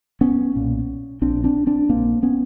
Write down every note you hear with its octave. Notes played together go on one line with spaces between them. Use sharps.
B3 C#4
B1 A#2
A#1 A#2 C4 D4
C4 D4
C4 D4
A#1 A#2 A#3 C4
B3 C#4